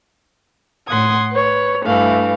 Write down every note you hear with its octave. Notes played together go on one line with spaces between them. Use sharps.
A2 F#5 C6 D#6 G#6
B4 C#5
G2 E3 A3 F5